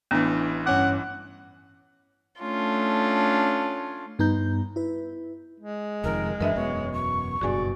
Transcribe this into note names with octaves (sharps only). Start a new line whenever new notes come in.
A1 E3 B3 D4
G2 C#4 F#5 D6
A3 C#4 D4 F4
G2 B3 D#4 A#5 G6
E4 B4
G#3
F1 F2 D#3 A#4
F#2 E3 D4 A#4 B4 D#5 E5
E1 F#2 B3 C#5
C#6
F#1 G2 B2 F#4 G#4 D5 G#5